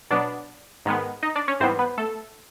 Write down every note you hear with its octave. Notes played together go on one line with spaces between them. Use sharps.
B2 F#3 B3 D4 D5
G#2 D#3 G#3 B3
D#4 D#5
D4 D5
C#4 C#5
G#2 E3 G3 B3 C4 C5
B3 B4
A3 A4